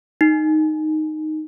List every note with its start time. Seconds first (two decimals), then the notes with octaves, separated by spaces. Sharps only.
0.21 D#4